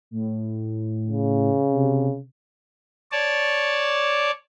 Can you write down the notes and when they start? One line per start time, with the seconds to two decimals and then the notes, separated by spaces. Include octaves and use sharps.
0.11 A2
1.07 C#3
1.71 C3
3.12 C#5 D5 A5